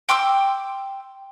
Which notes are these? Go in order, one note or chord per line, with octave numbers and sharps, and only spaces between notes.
G5 C6 D6 E6